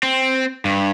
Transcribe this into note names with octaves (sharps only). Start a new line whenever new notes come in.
C4
G2